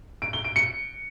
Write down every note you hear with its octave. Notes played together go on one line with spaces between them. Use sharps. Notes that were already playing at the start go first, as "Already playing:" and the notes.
D7
G7
D7
C#7